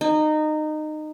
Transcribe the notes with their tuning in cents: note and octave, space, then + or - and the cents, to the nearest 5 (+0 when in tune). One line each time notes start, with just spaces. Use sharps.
D#4 -20